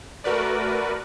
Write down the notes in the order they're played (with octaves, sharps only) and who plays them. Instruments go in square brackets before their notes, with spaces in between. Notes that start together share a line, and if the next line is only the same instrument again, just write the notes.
[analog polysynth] A3 F#4 A#4 B4 D5